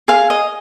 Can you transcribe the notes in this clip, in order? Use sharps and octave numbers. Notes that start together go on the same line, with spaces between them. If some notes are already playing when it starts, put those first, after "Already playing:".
G#4 F5
D#5